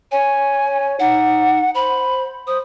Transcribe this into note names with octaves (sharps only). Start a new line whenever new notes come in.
C#5 G#5
D#4 F#5
C5 B5
C5 D#6